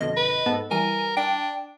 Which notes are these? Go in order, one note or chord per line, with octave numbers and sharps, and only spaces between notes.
F2 B2 D3 D#5
B4
G#2 B3 A4
E3 G3 A#4 G#5
D4 G5